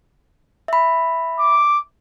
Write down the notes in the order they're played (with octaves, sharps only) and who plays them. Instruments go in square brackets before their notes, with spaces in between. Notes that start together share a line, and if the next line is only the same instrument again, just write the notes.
[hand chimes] E5 B5
[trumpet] D6